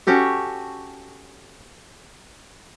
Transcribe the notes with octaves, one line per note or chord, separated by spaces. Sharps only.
C#4 F#4 G4 A4